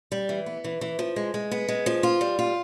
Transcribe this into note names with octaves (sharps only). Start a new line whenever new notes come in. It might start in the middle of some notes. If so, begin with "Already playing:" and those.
G3
E3
B3
E3
E3
F3
G#3
G#3
B3
G#3
F3
F4
G3
F4